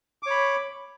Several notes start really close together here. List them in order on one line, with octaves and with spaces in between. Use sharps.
D6 C#5 B5